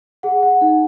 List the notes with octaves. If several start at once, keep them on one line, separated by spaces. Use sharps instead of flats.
G#4 F#5
F#5
D#4 F#5